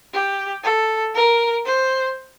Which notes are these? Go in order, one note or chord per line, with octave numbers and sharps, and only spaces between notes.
G4
A4
A#4
C5